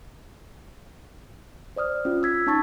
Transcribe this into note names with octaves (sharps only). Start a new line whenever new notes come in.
C5 D5 D#6 F6
C#4 F4
E6 G#6 B6
C#4 D#4 A5 C#6 G#6 A6